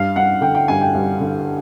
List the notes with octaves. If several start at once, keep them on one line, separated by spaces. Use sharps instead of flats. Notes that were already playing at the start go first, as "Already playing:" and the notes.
Already playing: G2 F5
G2 F#5
D3 G5
G5
G2 G#5
G5
G2
D3